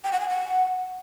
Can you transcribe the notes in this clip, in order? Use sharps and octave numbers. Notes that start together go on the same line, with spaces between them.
G5
F#5
G#5
F#5